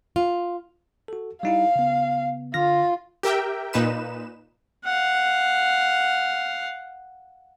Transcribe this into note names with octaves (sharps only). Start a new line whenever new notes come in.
F4
F#4 A4
G3 D#4 E4 F5
C#3 B3
D3 F4 F6 A#6
G4 A#4 E5 G5
A#2 D#4 B4 E7
F5 F#5